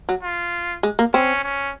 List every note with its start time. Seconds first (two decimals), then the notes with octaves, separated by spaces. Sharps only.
0.09 F#3
0.23 F4
0.83 G#3
0.99 A#3
1.14 C4 C#4
1.44 C#4